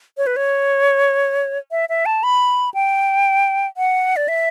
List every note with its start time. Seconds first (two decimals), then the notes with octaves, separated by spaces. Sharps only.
0.17 C#5
0.26 B4
0.36 C#5
1.71 E5
1.89 E5
2.06 A5
2.23 B5
2.74 G5
3.77 F#5
4.16 D5
4.28 E5